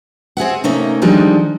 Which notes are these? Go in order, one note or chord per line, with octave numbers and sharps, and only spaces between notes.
C4 G#4 E5 F#5
C3 A3 A#3 C#4 D#4
D3 D#3 F3 G3 G#3 D#4